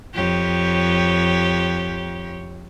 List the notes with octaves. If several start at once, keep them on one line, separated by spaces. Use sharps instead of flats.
F2 G4 C#5